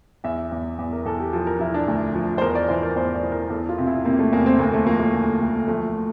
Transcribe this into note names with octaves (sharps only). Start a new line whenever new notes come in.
E2 E5
E2
E2
A#4
E2 A4
G4
F3 A4
A#4
F3 E4
D4
D2
F3
C5
E2 A#4
D5
E3 C5
A#4
E2 C5
D5
E3
A#4
E2 A4
F4
C3
E4
C3 A#3
A3
E2 A#3
C4
D2 A#3
A3
F3 A#3
A3
D2
D2
F3 A3